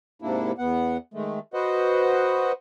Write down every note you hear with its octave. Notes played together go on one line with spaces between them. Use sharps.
G#2 C3 A#3 D4 E4
E2 B3 F#5
D#3 G#3 A3
F#4 B4 C5 D#5 F#5